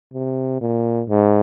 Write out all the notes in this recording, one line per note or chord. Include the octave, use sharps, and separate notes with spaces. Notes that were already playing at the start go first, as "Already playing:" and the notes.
C3
A#2
G#2